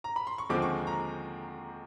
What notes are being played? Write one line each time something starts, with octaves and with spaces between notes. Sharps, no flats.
A#5
B5
C6
C#6
D#2 D3 F3 G#3 C4 D6
C#6
A#5